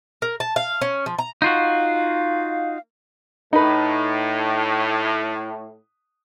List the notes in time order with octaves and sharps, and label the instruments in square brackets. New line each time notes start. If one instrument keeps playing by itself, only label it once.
[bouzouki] A#4
A5
F5
C#4
F3
A#5
[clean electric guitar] D#4 F4 F#4 [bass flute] F5
[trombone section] A2 [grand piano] D#4 B4